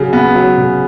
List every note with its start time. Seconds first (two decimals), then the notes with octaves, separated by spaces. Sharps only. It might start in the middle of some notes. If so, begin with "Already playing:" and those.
Already playing: C#3 F#3
0.13 B3
0.35 F#3
0.58 C#3